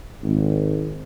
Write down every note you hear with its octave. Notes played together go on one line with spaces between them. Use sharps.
G#1